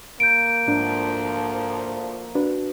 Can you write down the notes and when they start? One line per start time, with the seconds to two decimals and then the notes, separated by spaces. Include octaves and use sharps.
0.20 A#3 G6 D7
0.67 D2 G#2 F3 D4
2.35 D4 F#4 B4